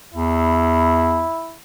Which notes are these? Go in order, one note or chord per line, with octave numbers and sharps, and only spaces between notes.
E2 E4